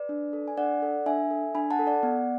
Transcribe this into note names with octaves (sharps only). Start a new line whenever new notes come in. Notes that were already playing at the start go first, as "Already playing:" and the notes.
Already playing: B4 D5
D4
A4
G#5
D4 D5 F#5
A4
D4 E5 G#5
A4
D4 G#5 B5
F#5 A5
A4
D5 F#5
B3